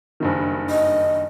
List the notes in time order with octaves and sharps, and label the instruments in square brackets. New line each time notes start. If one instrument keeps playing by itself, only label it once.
[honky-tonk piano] F#1 G2 D#3
[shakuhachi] D#5